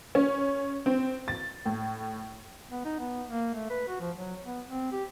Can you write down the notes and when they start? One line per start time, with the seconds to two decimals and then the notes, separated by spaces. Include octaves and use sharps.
0.15 C#4
0.86 C4
1.28 A6
1.66 A2
2.71 B3
2.85 D#4
3.00 B3
3.28 A#3
3.54 A3
3.70 B4
3.88 F#4
4.01 F3
4.17 F#3
4.45 B3
4.69 C4
4.92 G4